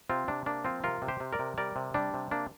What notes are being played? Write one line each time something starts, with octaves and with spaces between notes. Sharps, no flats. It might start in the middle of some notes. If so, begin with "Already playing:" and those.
C3 C4 F4
C3 D4
A#3 D4
F3 C4 F4
C3 F4 A#4
C3
G4 C5
C3
A#4 D5
C3
G3 A#4 D5
C3
G3 D4
C3
A#3 D4